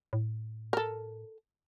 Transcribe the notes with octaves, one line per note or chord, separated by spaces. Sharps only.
A2
A4 A#4